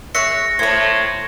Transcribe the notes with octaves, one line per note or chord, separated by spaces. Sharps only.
G#4 C#5 E5 F#6 A#6 C#7
A2 C5 C#5 G#6